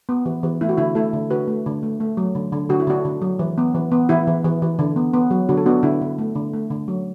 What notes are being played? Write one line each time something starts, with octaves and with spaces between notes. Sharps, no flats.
B3
E3
E3
A3 E4
F#4
D3 E4
A3 E4 A4
D3
D3 F#4 B4
A3
D3
A3
A3
F#3
D3
D3
D3 F#4
E4
D3 D4 F#4
D3
F#3
E3
B3
E3
B3
E3 E4
E3
E3
E3
D3
B3
B3
F#3
D3 F#4
A4
B3 D4 F#4
D3 E4
D3
A3
D3
A3
D3
F#3